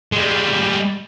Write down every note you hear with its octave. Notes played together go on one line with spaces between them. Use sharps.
G3 G#3